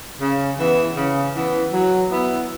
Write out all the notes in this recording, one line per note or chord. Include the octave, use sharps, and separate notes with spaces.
C#3
E3 B3
C#3
E3 B3
F#3
B3 E4